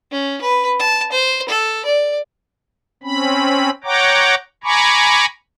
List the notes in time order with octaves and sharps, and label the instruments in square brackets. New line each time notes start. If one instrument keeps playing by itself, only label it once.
[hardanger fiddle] C#4
B4
A5
C5
A4
D5
[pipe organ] C4 C#4 B5
C#5 F#5 G5 A#5 D6
G#5 A#5 B5 C#6 D6